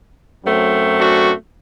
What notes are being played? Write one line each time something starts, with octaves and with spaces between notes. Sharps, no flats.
F#2 F#3 A3 C4
D4 F#4